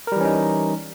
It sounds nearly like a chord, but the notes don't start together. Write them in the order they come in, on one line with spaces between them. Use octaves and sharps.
A#4 G3 E3 C#4 D#4